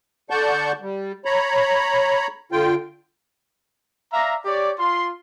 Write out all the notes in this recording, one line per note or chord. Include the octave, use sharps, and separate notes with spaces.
D3 D5 F#5 A5 C#6 G6
G3
C#5 A#5 B5
D3 F4 G5
D5 E5 F5 A#5
G4 C#5 D5
F4 C6